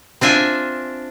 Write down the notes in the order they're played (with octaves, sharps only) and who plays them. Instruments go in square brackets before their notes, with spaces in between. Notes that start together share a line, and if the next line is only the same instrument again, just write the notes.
[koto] C4 D4 F4 E5 G#5